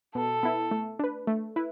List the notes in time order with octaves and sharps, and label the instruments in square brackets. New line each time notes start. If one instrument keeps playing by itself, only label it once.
[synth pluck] B2 [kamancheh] A4
[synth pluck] B3 E4
A3
D4 B4
A3
E4 B4